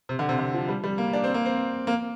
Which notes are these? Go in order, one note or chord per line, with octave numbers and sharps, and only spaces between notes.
C3
D3
C3
D3
F3
G3
G3
A#3
D4
C4
A#3
C4
A#3